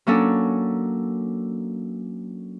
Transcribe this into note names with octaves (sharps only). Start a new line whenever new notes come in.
F#3 A#3 C#4 D4 A4